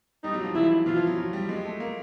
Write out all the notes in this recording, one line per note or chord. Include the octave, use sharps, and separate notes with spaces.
G3 D#4
F#3
F3
E3 E4
E3 F4
F3
F#3
F#3
G3
G#3
A3
A#3